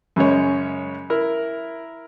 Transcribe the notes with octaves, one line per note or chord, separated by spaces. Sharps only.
F#2 C#3 G#3 C#5
E4 A#4